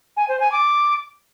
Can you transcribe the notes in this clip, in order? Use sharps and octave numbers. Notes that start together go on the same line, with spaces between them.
G#5
C5
G#5
D6